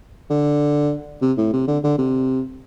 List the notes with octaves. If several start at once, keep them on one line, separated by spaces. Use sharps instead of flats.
D3
C3
A2
C3
D3
D3
C3